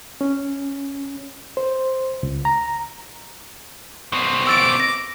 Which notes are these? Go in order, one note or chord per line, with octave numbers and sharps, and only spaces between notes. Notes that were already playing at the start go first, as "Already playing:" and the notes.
C#4
C5
C#2
A#5
B2 C4
D6 E6 A6 D7
A#6